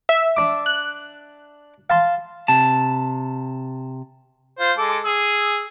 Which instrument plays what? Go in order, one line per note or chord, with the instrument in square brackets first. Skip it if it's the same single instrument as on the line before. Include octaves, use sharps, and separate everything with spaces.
[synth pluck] E5
[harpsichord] D4 D6
[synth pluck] F#6
[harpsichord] F5 A5 C6
[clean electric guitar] C3 A5
[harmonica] F4 C5
G#3 A4 D6
G#4 E6